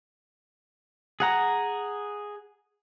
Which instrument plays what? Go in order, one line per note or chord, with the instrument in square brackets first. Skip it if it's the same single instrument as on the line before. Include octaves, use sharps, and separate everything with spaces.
[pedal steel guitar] G#4 F#5 A#5